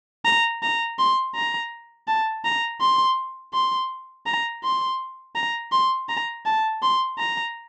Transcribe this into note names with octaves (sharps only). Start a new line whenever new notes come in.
A#5
A#5
C6
A#5
A5
A#5
C6
C6
A#5
C6
A#5
C6
A#5
A5
C6
A#5